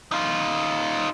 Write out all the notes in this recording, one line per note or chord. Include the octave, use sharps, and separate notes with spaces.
D#4 F4